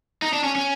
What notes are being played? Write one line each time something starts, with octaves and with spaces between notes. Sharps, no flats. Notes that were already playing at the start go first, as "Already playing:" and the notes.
D#4
D4
C#4
C#4